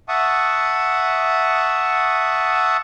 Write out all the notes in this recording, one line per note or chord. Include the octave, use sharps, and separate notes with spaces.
E5 F#5 A5 C#6 D#6